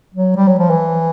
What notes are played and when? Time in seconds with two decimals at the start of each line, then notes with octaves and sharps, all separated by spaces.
0.14 F#3
0.36 G3
0.48 F#3
0.59 F3
0.70 E3